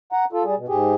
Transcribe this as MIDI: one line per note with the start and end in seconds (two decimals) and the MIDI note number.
0.12 0.25 78
0.12 0.25 82
0.33 0.43 65
0.33 0.43 69
0.44 0.55 55
0.44 0.55 68
0.57 0.66 47
0.68 0.95 44
0.68 0.95 67
0.68 0.95 68